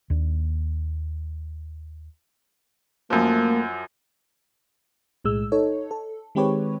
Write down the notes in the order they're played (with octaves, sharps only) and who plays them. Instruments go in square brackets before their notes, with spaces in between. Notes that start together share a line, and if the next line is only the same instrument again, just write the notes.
[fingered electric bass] D#2 D4
[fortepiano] F#2 F3 [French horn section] A3 A#3
[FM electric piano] B1 A2 G#3 E6
D#4 A4 C#5
A4
D#3 G#3 C4 G4 B4 C#5